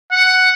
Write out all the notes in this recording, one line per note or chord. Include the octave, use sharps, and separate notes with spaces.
F#5